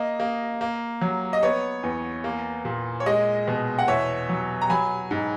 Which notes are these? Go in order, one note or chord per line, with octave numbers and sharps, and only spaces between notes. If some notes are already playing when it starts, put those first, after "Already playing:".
Already playing: A#3 D#5
A#3
A#3
F#3
D#5
B3 C#5
E2
A#3
A#2
C#5
G#3 D#5
B2
F#5
E2 C#5 E5
F#3
A#5
F#3 G#5 B5
G#2